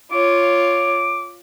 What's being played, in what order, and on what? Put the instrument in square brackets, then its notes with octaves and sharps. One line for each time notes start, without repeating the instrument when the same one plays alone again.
[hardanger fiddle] F4 C#5 [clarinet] D6